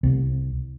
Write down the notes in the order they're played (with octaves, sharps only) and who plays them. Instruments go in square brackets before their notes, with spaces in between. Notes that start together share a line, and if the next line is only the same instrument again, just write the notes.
[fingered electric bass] C2